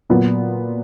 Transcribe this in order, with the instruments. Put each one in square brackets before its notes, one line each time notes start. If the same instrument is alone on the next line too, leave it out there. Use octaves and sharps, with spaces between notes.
[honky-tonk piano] A#2 F#3 B3 F4